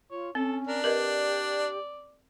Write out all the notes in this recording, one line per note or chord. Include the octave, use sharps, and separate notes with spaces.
F4 C#5
C4 C#4 A4
D4 A#4
G4 A#4 B4 D5 D#5